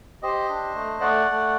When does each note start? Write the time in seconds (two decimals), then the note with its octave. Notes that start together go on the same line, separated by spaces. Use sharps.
0.23 G4 C5 D#5
0.49 D4
0.75 A3
1.01 A3 D5 F#5
1.26 A3